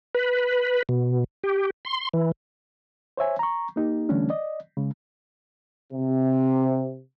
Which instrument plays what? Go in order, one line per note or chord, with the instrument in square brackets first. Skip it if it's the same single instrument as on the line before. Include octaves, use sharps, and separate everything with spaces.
[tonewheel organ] B4
B2
G4
C6
E3
[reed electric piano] C5 C#5 E5 G#5
A#5 C#6
A#3 D#4 G4
D3 E3 G3 A3 C#4 D4
D5 D#5
C#3 G#3
[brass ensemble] C3